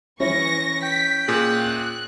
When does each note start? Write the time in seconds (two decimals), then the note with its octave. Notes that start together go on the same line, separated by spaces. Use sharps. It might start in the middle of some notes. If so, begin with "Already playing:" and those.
0.20 E3 C#4 E4 C#5 C#6 A#6
0.83 G5 B6
1.28 A#2 G#4 F#6